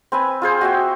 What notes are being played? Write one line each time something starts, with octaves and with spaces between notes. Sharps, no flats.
C4 B4 G#5
F4 G#4 C5
F#4 E5 G5